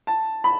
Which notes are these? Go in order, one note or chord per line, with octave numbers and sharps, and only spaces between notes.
A5
B5